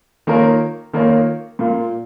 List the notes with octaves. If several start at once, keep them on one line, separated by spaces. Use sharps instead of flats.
D#3 A#3 F4 A#4 C#5
D#3 A#3 F4 A#4 C#5
A#2 A#3 F4